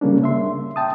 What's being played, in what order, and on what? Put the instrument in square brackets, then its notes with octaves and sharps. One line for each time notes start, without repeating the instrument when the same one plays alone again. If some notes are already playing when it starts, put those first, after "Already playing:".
[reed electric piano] C#3 G3 A#3 C#4 D4
E5 C6
G5 A5 D#6